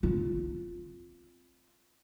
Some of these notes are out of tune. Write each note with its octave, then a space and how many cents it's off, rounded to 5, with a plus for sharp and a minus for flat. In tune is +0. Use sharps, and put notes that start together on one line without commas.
C4 +0 F4 +0